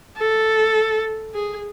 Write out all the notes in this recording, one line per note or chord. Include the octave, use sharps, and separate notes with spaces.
A4
G#4